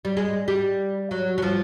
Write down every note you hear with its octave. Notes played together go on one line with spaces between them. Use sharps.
G3
G#3
G3
F#3
F#3
F3